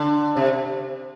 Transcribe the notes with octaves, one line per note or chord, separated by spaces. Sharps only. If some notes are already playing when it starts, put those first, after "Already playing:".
Already playing: D3
C3